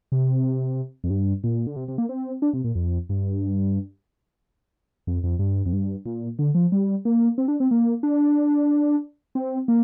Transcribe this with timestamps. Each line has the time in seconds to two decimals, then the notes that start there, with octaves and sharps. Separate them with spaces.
0.12 C3
1.04 F2
1.10 G2
1.44 A#2
1.67 D3
1.76 C3
1.88 C3
1.98 A#3
2.09 C4
2.42 D4
2.54 C3
2.64 A#2
2.75 F2
3.09 G2
5.07 F2
5.24 F2
5.39 G2
5.66 F2
5.73 G2
6.06 A#2
6.39 D3
6.55 F3
6.72 G3
7.05 A#3
7.38 C4
7.48 D4
7.60 C4
7.71 A#3
8.03 D4
9.35 C4
9.68 A#3